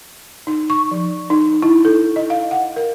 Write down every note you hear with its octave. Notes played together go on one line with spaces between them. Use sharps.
D#4
C#6
F3
D#4
E4
A4
D#5
F5
F#5
A#4